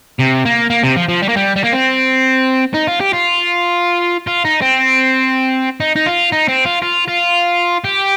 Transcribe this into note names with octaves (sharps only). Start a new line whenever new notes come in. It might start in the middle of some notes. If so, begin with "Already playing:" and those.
C3
A#3
A#3
C3
F3
F3
G3
A#3
G3
G3
A#3
C4
D#4
F4
G4
F4
F4
D#4
C4
D#4
D#4
F4
D#4
C4
F4
F4
F4
G4